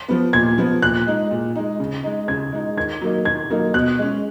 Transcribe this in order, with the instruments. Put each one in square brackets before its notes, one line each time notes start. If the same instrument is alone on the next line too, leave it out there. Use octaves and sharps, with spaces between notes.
[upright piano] F3 B3
[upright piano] A#2 [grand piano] G#6
[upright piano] F3 B3
[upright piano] A#2 [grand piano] F#6
[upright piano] G#3 D#4
A#2
G#3 D#4
C#3
G#3 D#4
[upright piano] C#3 [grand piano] G#6
[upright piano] G#3 D#4
[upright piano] D#3 [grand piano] G#6
[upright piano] F#3 A#3 D#4
[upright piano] D#3 [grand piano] G#6
[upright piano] F#3 A#3 D#4
[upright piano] B2 [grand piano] F#6
[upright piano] G#3 C#4